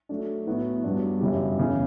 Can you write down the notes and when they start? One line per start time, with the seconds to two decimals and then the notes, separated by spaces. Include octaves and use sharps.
0.09 F#3 A3 D4
0.47 A2 F#3 B3 E4
0.84 G2 F#3 B3 D4
1.21 F#2 C#3 E3 G3
1.57 E2 C#3 E3